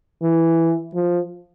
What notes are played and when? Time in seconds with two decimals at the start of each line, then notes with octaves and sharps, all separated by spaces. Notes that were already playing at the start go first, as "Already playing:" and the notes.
0.22 E3
0.95 F3